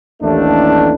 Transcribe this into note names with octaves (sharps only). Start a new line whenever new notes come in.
A1 D#2 A3 D4